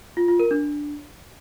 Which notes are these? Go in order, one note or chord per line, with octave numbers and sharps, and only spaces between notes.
F4
F4
A#4
D4